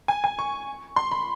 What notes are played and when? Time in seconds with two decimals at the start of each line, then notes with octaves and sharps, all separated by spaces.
0.08 G#5
0.24 G#5
0.39 C#6
0.96 C6
1.11 B5